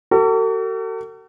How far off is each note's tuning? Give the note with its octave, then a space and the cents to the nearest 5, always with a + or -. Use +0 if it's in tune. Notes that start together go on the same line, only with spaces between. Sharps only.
F#4 +45 A4 +45